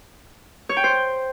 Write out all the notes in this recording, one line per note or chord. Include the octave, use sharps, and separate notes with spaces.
C#5
G5
C5